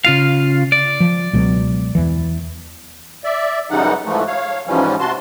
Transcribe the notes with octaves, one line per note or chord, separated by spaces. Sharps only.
C#3 F4 F5
D5
F3
C#2 B2 F#3
E2 E3
D5 E5
F#2 C#3 E3 G3 D#4 F#5
G#2 E3 F3 A3
C#5 F5
G#2 E3 F3 G3 C#4
C3 F#4 A5 C6